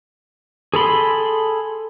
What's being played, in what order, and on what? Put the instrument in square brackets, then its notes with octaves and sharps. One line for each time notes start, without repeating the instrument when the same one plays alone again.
[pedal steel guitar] G#4 A4 B5 C6